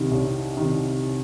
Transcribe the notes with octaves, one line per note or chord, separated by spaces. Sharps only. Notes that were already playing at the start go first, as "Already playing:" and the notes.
Already playing: C2 C3 D#3
C2
C3 D#3